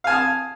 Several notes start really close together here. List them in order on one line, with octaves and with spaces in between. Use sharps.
F5 G#5 A5 D#6